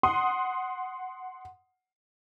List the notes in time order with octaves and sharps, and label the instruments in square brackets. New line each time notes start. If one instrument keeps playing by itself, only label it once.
[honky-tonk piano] F#5 C6 D#6